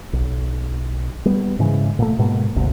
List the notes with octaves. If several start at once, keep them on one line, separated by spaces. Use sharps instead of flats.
B1
G3 B3
G#2 C#3 E3 G#3
A#2 A3
G#2 B2 G#3 A#3
G#1 D2 C3